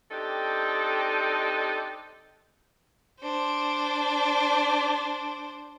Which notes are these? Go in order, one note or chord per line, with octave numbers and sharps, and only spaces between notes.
C4 D4 D#4 G4 A4
D4 C5